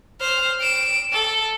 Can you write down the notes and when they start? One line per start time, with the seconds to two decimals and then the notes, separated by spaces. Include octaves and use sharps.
0.20 C5 F6
0.60 D7 E7
1.12 A4